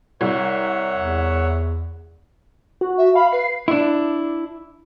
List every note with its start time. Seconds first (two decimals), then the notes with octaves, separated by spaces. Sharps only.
0.21 C2 C#5 E5 F#5
0.96 E2
2.81 F#4
2.98 E5
3.15 F5 B5
3.33 B4 C7
3.68 D4 E4